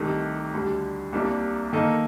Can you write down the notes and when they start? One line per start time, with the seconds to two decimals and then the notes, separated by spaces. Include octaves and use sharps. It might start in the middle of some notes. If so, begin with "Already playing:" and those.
Already playing: C2 C3 D#3 A3 D#4
0.53 D2 D3 G3
1.13 C2 C3 G3 A#3 D4
1.73 D#3 A#3 D#4 A4 D#5